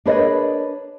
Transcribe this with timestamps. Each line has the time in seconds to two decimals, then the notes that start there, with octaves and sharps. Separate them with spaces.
0.06 D4 G#4 A#4 B4 C#5 D#5